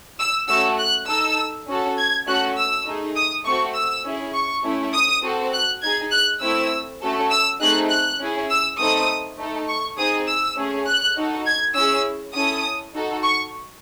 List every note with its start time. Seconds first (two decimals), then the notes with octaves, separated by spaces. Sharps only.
0.19 E6
0.48 A3 C#4 F#4 A4 E6
0.78 F#6
1.07 D#4 A4 E6
1.67 C#4 F#4 A4
1.97 G#6
2.27 A3 C#4 F#4 A4 F#6
2.57 E6
2.85 A3 D#4 G#4
3.16 D#6
3.44 A3 C4 F#4 A4 C#6
3.74 E6
4.04 C#4 E4 G#4
4.33 C#6
4.64 A3 C#4 E4
4.93 D#6
5.23 C4 F#4 A4
5.53 F#6
5.82 D#4 G#4 G#6
6.11 F#6
6.42 A3 C4 E4 E6
7.02 A3 C#4 F#4 A4
7.31 E6
7.60 A3 C4 D#4 G#4 F#6
7.90 F#6
8.19 C#4 E4 G#4
8.50 E6
8.79 A3 C4 D#4 A4 D#6
9.38 A3 D#4 A4
9.68 C#6
9.97 C4 D#4 G#4 D#6
10.28 E6
10.57 A3 C#4 G#4
10.87 F#6
11.16 D#4 F#4 A4
11.46 G#6
11.75 C#4 E4 G#4 E6
12.35 C#4 E4 A4 D#6
12.93 D#4 F#4 A4
13.23 C#6